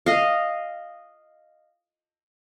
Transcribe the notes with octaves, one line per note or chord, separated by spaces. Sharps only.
D#5 F5